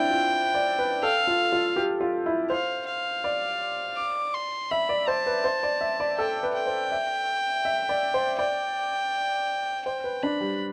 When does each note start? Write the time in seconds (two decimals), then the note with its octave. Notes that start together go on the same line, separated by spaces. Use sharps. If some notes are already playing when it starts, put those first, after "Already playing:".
Already playing: C4 D4 E4 G5
0.11 F4
0.54 D5
0.79 B4
1.03 A4 F5
1.27 F4
1.52 F4
1.76 G4
2.01 F4
2.26 E4
2.50 C5 F5
2.87 F5
3.24 D5
3.97 D6
4.34 C6
4.71 E5 B5
4.89 D5
5.08 C5 A5
5.26 B4
5.44 C5
5.63 D5
5.81 E5
6.00 D5
6.18 A4 G5
6.43 B4
6.55 G5
6.66 C5
6.92 E5
7.65 E5
7.89 D5
8.14 C5
8.39 D5 G5
9.86 C5 G5
10.04 B4
10.23 D4 B5
10.41 G3